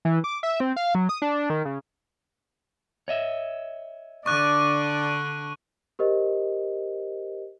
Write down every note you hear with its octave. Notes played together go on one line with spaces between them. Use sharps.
E3
D6
E5
C4
F5
F#3
D#6
D4
D#3
C#3
C#5 D#5 E5
D3 D4 D5 C#6 F#6 D#7
G4 A#4 C5 D#5